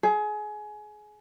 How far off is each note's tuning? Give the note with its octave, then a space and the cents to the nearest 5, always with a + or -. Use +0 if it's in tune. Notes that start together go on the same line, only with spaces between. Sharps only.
G#4 +25